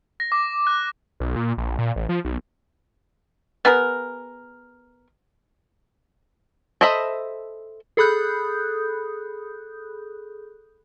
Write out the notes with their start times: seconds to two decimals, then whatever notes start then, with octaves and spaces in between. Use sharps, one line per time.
0.20 A#6
0.32 D6
0.67 F#6
1.20 B1
1.36 A#2
1.58 A#1
1.79 A#2
1.96 A1
2.09 F3
2.25 B1
3.65 B3 G#4 A#4
6.81 A4 C5 D#5 E5 B5
7.97 G#4 A4 B5 D#6 F#6 G6